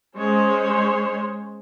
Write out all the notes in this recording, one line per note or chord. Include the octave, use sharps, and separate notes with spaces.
G#3 C#4 C5 C#5